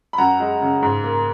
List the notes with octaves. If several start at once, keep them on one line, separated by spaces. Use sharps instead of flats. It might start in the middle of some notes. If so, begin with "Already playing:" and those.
B5
F#2 F#5 A#5
G#3
C#3
G#2
A#3